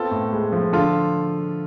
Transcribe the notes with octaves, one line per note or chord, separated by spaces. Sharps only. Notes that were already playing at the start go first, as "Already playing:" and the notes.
Already playing: B3 C4 F4 A4
A2
G#3
F3
D3 F4 A4